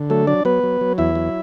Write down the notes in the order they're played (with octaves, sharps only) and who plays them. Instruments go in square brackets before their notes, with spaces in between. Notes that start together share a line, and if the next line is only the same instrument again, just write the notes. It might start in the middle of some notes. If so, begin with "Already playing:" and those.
Already playing: [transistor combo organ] D3
F#3 A3 A4
F#3 D4 D5
F#3 B3 B4
F#3
F#3
E2 E4 E5
F#3